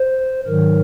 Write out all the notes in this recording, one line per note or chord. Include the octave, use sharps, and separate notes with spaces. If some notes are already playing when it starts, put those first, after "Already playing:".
Already playing: C5
G#2 D#3 F#3 A#4